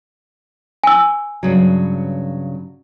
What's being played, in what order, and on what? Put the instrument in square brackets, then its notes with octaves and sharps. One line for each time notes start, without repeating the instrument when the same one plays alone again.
[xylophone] G#5 E6
[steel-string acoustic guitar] G2 C#3 F#3